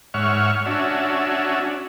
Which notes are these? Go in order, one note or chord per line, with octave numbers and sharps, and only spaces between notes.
G#2 C#5 E5 F#5 C#6 F6
C#4 D4 F#4 E5